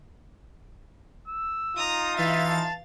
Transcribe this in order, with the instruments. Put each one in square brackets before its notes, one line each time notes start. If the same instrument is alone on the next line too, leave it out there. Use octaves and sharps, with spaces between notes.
[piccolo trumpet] E6
[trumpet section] D#4 F4 [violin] A#5 D#6
[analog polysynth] E3 A6 [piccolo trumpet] E5 [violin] F5
[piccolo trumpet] A5